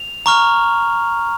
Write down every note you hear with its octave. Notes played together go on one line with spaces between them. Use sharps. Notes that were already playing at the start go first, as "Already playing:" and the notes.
Already playing: F7
A#5 C#6 F6